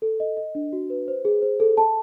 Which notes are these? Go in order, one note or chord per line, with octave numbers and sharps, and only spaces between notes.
A4
D#5
D#5
D4
F#4
B4
C5
G#4
C5
A4
A5